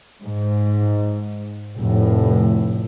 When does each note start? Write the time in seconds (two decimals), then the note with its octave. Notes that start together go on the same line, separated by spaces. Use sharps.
0.22 G#2
1.78 F1 A2